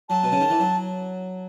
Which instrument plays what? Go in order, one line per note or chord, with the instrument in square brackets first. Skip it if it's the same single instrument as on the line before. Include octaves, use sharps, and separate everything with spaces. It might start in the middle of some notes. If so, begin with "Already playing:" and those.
[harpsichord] F#3 [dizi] A5
[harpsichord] B2
C#3
D#3
E3
F#3